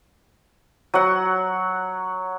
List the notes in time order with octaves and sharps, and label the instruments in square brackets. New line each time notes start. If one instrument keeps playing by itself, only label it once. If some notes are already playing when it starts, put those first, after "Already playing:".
[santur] F#3 F#5